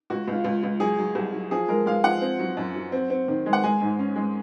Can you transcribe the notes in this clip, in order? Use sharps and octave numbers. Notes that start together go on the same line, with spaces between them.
C#2 F#4
C#2
F4
C#2
C#2
F#3 G#4
F#3
C2
F#3
F3 G#4
G#3 A#4
G#3 F5
F3 F#5
C4
F#3
F#2
F#3
C4
C4
D#3
G#3
F#5
G#3 G#5
G#2
C#4
G#3